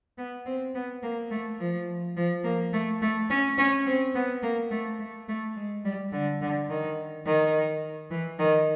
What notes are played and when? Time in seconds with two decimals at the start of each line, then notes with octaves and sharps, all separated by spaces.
0.18 B3
0.46 C4
0.74 B3
1.03 A#3
1.31 A3
1.59 F3
2.17 F3
2.44 A#3
2.73 A3
3.02 A3
3.30 C#4
3.58 C#4
3.86 C4
4.15 B3
4.43 A#3
4.71 A3
4.99 A3
5.28 A3
5.56 G#3
5.85 G3
6.12 D3
6.41 D3
6.69 D#3
7.26 D#3
8.11 E3
8.39 D#3